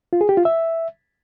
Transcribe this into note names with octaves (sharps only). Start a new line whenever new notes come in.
F4
G#4
G4
F4
E5